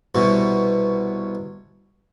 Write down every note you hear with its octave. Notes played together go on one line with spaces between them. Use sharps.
C2 B2